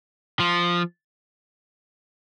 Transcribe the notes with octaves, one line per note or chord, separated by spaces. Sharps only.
F3